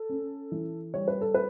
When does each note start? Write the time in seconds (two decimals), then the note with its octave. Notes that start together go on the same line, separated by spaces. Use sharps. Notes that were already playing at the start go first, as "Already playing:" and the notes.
Already playing: A4
0.09 C#4
0.52 E3
0.94 G3 C#5
1.08 B4
1.21 A4
1.34 B4